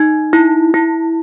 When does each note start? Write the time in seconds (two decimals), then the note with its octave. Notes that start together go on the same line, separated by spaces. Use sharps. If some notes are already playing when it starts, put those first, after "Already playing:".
Already playing: D#4
0.33 E4
0.74 E4